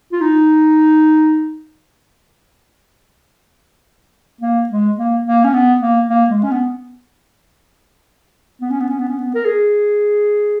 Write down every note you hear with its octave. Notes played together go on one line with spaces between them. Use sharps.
F4
D#4
A#3
G#3
A#3
A#3
C#4
B3
A#3
A#3
G#3
C#4
B3
B3
C#4
B3
C#4
B3
C#4
B3
A#4
G#4